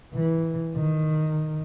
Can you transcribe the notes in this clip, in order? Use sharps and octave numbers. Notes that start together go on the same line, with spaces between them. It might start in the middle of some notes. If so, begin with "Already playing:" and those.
E3
D#3